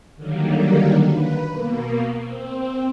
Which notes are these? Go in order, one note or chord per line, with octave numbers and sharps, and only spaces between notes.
D3 D#3 F#3 G3 A#3
B4
B2 A#3
C4